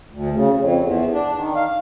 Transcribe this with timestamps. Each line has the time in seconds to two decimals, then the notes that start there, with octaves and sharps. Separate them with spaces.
0.12 D2
0.34 C#3
0.57 F2
0.81 E2
1.13 D4
1.36 D#3
1.56 F5